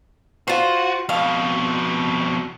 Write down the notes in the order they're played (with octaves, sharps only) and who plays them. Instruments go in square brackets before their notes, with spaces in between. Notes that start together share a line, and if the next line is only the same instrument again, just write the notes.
[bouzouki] F4 C5 [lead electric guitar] F#4
[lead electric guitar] F2 B2 [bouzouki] F5